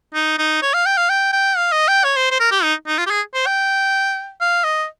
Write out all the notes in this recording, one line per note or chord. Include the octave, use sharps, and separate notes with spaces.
D#4
D#4
C#5
F5
G5
F5
G5
G5
F5
D#5
G5
C#5
C5
C5
A#4
G4
D#4
D#4
F4
G4
G#4
C5
G5
F5
D#5